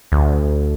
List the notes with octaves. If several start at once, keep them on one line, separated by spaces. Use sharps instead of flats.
D2